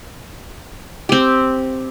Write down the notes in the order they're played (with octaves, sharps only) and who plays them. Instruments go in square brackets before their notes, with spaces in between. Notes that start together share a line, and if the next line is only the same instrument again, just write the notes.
[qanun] C4 G4